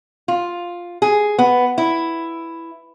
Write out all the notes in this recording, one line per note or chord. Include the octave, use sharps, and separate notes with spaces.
F4
G#4
B3
E4